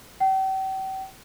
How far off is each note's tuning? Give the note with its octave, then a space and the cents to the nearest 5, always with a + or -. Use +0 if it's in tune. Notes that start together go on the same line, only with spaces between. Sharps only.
G5 -40